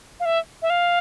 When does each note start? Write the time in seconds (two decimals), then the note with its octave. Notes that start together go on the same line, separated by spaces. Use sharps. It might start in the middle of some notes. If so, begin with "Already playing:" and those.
0.20 F5
0.25 E5
0.62 E5
0.70 F5